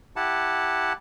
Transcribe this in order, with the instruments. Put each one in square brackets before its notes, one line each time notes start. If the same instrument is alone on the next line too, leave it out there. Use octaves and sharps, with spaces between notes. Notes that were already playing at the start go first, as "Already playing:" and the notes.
[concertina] E4 G4 F#5 A5